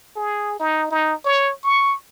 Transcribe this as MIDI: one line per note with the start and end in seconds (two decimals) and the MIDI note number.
0.16 0.59 68
0.60 0.88 63
0.91 1.14 63
1.25 1.53 73
1.64 1.95 85